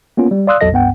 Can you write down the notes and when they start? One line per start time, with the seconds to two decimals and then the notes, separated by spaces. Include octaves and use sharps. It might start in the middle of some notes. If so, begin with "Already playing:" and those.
0.17 A#3 B3 C#4 F4
0.31 G3
0.47 D5 F5 C6 D#6 E6 F#6
0.61 A1 E2 F#3 A4 D#5 A#6
0.72 C#2 G2 B3 F#5 G5